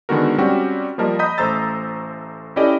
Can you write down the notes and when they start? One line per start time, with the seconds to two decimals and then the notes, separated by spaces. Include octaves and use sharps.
0.09 D3 D#3 G#3 B3 F#4 A#4
0.38 G3 C4 C#4 F#4 G4
0.98 F3 G3 A#3 A#4 D#5 A5
1.19 D#5 A#5 B5 D#6 G6 B6
1.38 A1 A3 C5 A#5 E6 A6
2.56 C#4 E4 G4 A4 D5 D#5